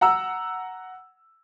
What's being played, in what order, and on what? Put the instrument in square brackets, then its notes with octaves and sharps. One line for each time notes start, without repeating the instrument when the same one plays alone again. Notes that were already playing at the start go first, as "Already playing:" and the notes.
[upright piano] F#5 A#5 E6